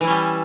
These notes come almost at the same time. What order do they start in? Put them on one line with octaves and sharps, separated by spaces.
E3 E4 C#4 G3